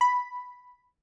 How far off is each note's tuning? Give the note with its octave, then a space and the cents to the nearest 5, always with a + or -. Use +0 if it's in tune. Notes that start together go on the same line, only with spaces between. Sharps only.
B5 +0